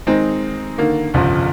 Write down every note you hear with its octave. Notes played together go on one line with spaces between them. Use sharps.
D#3 G#3 C4 D#4
D3 D#3 A#3
G1 C2 F2 C#3 F3